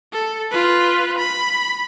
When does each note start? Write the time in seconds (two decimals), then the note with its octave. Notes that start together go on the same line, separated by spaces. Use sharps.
0.13 A4
0.51 F4 B4
1.18 B5